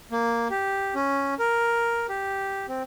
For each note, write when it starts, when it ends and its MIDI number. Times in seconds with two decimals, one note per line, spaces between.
0.12 0.48 58
0.50 0.94 67
0.95 1.34 61
1.39 2.06 70
2.09 2.66 67
2.68 2.83 60